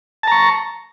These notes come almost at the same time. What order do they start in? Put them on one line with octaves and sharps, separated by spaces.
A5 A#5 C#6